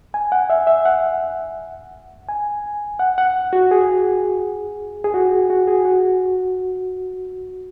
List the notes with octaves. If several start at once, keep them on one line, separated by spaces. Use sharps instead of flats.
G#5
F#5
E5
E5
F#5
G#5
F#5
F#5
F#4
G#4
G#4
F#4
F#4
G#4
F#4